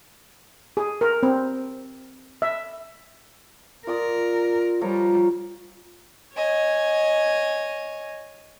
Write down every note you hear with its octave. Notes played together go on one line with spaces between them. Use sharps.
G#4
A#4
C4
E5
F4 A#4 D5 D#6
F3 G3 A#4 C#5
C#5 D#5 G#5